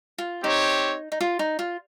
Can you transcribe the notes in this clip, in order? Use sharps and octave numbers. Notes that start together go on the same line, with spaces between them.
F4
C4 D#4 G4 C#5
D#4
F4
D#4
F4